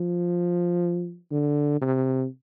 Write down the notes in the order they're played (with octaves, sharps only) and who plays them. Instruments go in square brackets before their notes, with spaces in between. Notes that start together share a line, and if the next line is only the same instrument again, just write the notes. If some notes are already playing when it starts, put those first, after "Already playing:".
Already playing: [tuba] F3
D3
C3